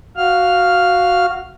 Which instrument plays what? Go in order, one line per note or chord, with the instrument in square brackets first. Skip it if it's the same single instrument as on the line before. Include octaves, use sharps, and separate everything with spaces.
[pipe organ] F#4 F5 F6